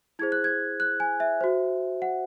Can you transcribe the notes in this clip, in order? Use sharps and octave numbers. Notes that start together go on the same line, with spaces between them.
E4 G#4 C5 G#6
F#6
G#6
F#6
G#5
E5
F#4 C5
F#5